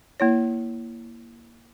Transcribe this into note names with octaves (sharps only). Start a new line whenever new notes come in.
A#3 E4 C#5